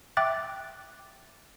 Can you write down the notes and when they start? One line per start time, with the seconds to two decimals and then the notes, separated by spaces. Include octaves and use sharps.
0.17 E5 G5 D6 F#6 A6